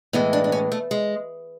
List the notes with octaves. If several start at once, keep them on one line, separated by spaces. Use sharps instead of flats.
A2 E3 G#3 B3
D4
D4
C#4
A3
G#3